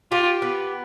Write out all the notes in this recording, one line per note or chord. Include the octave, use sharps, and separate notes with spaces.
F4 G4
B3